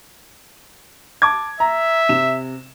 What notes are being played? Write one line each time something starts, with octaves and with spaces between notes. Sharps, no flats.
A5 D6 G#6
E5 A#5
C3 E7